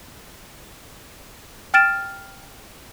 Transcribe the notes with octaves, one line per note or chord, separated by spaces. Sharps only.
G5 F6 A6 D7 E7